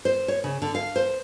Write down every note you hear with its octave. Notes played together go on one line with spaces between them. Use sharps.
C5
C#5
C#3
D3
F5
C5